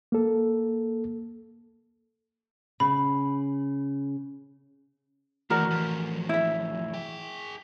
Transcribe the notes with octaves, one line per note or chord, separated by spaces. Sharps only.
A#3 A4
C#3 B5
D#3 E3 A3 F#4 A#4 D5
A2 F3
E4 E5
G#4 G5